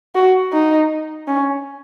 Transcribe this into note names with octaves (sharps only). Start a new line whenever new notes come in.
F#4
D#4
C#4